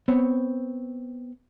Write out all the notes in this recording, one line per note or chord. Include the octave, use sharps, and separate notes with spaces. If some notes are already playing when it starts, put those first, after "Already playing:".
B3 C4 C#5